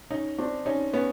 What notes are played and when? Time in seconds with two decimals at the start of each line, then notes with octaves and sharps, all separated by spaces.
0.10 C#4 D#4
0.39 C4 D4
0.66 C#4 D#4
0.93 B3 C#4